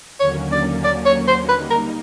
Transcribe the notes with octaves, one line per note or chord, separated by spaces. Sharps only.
D#2 D3 F#3 A#3 C#4 C#5
D5
D5
C#5
C5
G3 A#3 D#4 B4
A#4